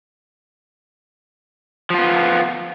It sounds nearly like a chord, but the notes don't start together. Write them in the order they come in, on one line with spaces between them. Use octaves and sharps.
F3 F4 B3